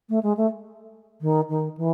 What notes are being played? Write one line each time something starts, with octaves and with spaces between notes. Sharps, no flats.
A3
G#3
A3
D#3
D#3
E3